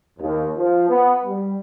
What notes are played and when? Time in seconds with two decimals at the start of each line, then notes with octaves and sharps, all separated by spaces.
0.20 D#2
0.57 F3
0.89 B3
1.24 G3